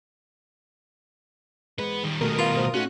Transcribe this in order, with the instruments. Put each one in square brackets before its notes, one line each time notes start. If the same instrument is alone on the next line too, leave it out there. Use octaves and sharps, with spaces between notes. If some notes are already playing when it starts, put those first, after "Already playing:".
[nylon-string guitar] G#2 E3 G#3 [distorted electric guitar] B3 B4
[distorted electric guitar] D#3 G3
[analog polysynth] B2 A#4 D#6 [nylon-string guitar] A3 B3 G4
[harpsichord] F4 [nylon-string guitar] B4
[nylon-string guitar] D2 A2 C5
[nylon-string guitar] A2 A3 D#4 [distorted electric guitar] C#4 [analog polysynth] F#4 F#6